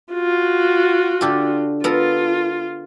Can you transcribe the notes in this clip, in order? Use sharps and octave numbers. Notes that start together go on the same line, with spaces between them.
F4 F#4
D3 G4 A4
B3 F4 A4 A#4